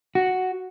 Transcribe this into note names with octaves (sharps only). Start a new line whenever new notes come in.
F#4